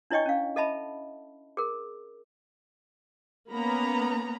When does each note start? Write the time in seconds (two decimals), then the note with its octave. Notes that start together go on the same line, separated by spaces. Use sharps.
0.11 D4 E4 C#5 D#5 G5 C#6
0.26 C#4 F5
0.56 A4 D#5 E5 A5 B5
1.57 G#4 A#4
3.50 A#3 B3 C#4 A#5 B5